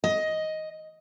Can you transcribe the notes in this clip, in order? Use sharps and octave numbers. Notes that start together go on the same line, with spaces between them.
D#5